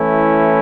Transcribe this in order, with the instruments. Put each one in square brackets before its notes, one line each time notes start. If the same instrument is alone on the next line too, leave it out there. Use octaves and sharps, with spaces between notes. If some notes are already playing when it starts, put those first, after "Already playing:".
Already playing: [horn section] E3 A3 C#4 E4